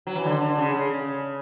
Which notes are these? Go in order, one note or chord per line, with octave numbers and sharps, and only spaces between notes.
F#3
E3
D3
D3
C#3
C#3
C#3